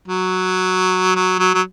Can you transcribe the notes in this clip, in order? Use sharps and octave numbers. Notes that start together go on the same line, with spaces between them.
F#3
F#3
F#3
F#3